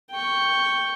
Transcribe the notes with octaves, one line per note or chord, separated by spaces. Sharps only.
G5 C#6